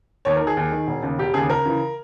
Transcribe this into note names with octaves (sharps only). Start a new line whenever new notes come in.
D#2 C#5
A#4
D#3
G#4
D#2
D#3
E1
D#2 C#3
E1 G4
D#2 C#3 G#4
C#2 A#4
C#3 E3